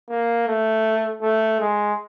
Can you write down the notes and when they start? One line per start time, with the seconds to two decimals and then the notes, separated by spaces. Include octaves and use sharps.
0.10 A#3
0.48 A3
1.22 A3
1.60 G#3